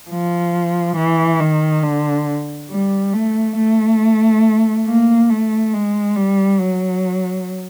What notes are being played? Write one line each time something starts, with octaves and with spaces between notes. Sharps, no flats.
F3
E3
D#3
D3
G3
A3
A3
A#3
A3
G#3
G3
F#3